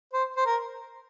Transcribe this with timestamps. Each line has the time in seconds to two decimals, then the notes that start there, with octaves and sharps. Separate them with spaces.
0.13 C5
0.36 C5
0.46 A#4